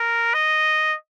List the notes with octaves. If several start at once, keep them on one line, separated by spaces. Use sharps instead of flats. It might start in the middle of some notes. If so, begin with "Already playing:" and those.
Already playing: A#4
D#5